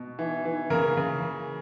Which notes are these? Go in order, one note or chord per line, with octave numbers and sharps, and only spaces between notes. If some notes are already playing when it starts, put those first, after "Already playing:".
Already playing: B2
E3
E3
C#3 A#3 A#4
C#3